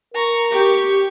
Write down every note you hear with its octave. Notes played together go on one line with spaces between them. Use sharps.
A#4 A#5 C#6
G4 C#6